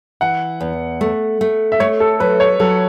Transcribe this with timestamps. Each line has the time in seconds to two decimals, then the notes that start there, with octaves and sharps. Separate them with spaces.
0.21 E3 F#5
0.61 E2
1.01 A3
1.41 A3
1.72 E5
1.80 A3 C#5
2.00 A4
2.20 F#3 B4
2.40 C#5
2.60 F#3 A4